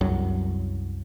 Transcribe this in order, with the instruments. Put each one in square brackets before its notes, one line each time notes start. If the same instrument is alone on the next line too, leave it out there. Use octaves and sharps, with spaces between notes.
[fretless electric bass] C2 F#2 F#3